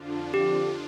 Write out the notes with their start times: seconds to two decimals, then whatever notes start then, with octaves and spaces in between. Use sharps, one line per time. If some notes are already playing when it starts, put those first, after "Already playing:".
Already playing: F2 D3 F3 D4 F4
0.34 G4